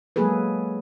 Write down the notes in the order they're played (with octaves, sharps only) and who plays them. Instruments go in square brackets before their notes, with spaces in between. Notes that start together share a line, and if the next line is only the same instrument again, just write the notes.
[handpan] F#3 G#3 A#3 G#4 A4 B4